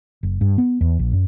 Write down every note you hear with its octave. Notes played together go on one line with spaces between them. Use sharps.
F#1
G2
B3
E2
A#1
F#2